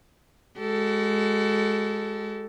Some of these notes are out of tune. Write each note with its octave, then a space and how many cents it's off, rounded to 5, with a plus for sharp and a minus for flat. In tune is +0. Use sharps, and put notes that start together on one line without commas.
G#3 +5 F#4 +45 A4 +5